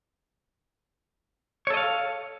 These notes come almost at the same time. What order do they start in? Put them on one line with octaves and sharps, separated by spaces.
C#5 A4 D#5 F5